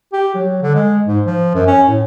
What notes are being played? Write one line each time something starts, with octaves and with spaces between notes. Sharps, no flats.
G4
F#3
D3
G#3
G#2
F3
F#2
C#4
A2